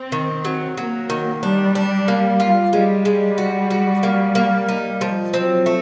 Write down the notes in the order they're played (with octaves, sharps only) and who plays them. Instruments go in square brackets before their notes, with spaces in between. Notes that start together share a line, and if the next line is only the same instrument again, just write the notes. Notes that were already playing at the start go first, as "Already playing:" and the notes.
Already playing: [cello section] C4
[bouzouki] D#3
F#3
[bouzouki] F#3 [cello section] A#3
[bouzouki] D#3
[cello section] G3 [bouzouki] D4
[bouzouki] D4
A#3
F4
[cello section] G3 [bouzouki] G#3
[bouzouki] G#3
F#4
F#4
A#3
A#3
D#4
F3
[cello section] F#3 [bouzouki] C4
[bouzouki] A3